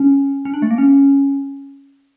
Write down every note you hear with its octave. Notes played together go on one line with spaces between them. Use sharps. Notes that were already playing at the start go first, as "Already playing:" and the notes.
Already playing: C#4
C#4
D4
A3
A#3
C#4